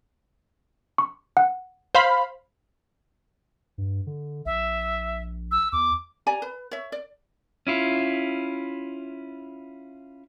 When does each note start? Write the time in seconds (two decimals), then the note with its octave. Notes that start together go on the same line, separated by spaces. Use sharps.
0.98 C#6
1.37 F#5
1.95 C5 F5 B5
3.78 G2
4.07 D3
4.46 A#1 E5
5.52 E6
5.72 E2 D6
6.27 G4 D5 G#5 A#5
6.42 B4
6.71 C#5 E5
6.92 D5
7.67 C#4 E4 F4